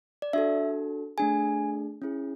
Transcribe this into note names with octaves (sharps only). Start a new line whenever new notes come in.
D5
D4 F#4 A4 E5
A3 D4 G#4 G#5
C#4 E4 G#4